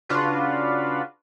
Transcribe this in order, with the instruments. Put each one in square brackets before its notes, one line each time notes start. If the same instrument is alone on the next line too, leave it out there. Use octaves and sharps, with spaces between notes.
[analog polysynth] C#3 D4 F4 F#4 B4